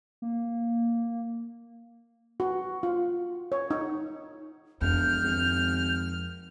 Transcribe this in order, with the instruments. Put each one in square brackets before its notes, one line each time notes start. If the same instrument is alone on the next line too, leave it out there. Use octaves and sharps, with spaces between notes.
[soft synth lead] A#3
[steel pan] F#4
F4
C#5
D#4
[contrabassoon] E1 [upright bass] F2 [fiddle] F6 [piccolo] G6
[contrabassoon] G#1